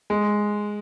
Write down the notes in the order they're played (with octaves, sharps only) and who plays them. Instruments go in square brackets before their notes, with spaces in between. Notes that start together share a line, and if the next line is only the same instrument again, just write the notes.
[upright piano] G#3